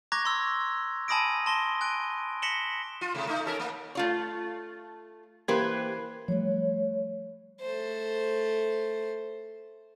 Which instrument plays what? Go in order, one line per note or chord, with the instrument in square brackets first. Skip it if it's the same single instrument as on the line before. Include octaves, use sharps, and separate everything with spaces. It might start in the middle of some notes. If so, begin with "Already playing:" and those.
[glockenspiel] A#5 C#6 D6 F#6 G#6 A#6
C6 E6
G#5 A5 B5 D#6 A#6 D7
A5 C6 A#6 G7
G#5 F#6 D7
A#6 B6 C#7 E7 F#7 G7
[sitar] F4
C3 A3
A3 D#4
C#4 A4 A#4
A#3
[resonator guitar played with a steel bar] A3 F4 C#5
[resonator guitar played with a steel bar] E3 B4 C5 [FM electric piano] A#3 G4 G#6
[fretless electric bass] F3 G3 A3 [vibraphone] C#5
[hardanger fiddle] A3 C5